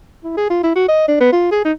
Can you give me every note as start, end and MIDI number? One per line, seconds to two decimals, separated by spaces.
0.24 0.33 64
0.37 0.47 68
0.50 0.61 65
0.63 0.71 64
0.76 0.84 66
0.89 1.08 75
1.08 1.19 62
1.20 1.32 59
1.33 1.51 65
1.51 1.60 68
1.65 1.72 63